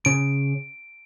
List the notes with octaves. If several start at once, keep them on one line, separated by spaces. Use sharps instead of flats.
C#3 D7